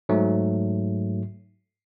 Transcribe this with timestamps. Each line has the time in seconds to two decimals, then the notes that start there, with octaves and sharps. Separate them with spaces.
0.09 G#2 F#3 A3